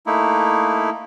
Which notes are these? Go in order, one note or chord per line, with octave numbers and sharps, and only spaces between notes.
A3 A#3 D#4 E4